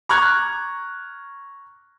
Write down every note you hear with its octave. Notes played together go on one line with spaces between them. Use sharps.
A#5 C#6 D6 F6 F#6 G#6